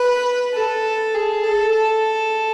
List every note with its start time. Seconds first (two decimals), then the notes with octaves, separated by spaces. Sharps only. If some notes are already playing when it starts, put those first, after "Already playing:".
Already playing: B4
0.54 A4
1.14 G#4
1.43 A4
1.73 A4